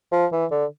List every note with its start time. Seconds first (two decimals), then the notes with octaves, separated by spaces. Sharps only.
0.12 F3
0.32 E3
0.51 D3